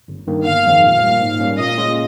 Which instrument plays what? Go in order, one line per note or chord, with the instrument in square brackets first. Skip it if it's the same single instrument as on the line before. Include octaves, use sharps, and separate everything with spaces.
[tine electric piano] G1
G2 D#3 A#3
[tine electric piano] G1 [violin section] F5
[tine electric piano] F2 D#3 G#3 C4
[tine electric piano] A#2 [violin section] F5
[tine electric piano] G3 A#3
G#2
G3 A#3 C#4
[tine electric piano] A#2 [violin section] D#5
[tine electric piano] G#3 C#4 F4